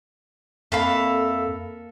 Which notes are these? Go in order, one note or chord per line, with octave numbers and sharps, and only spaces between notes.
F2 A#3 A4 E5 F5 B5